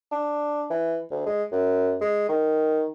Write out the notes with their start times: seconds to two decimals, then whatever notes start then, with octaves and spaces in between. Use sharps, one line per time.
0.11 D4
0.70 E3
1.11 D2
1.26 G#3
1.52 F#2
2.01 G#3
2.29 D#3